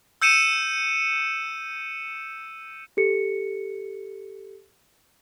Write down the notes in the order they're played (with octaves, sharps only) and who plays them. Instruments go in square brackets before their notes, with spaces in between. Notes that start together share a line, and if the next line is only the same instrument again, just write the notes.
[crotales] E6 G6 C#7 D#7 E7
[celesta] G4 A4 C#7